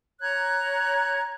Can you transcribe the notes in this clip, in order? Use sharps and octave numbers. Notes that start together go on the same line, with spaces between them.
C#5 A#5 F#6 G#6